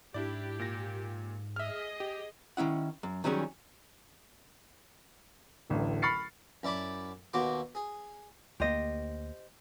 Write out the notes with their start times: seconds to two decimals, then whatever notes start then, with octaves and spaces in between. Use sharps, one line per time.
0.14 G#2 D4 E4 G4 D5
0.59 A#2 A#6
1.56 G#4 D#5 E5 F6
2.00 G4
2.57 D#3 C#4 E4 F#5
3.03 F#2
3.24 D#3 F#3 G3 C#4 G#4
5.70 D1 A1 D3
6.02 B5 C#6 F6 A6 C7 C#7
6.63 F#2 E4 D5 A5 B5 D6
7.33 D#2 B2 F#4 C6 D6
7.75 G#4
8.60 D2 A#3 G4 C5 D#5